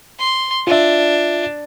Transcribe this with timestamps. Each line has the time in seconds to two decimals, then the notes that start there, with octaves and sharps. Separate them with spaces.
0.19 C6
0.67 D4 F4 E5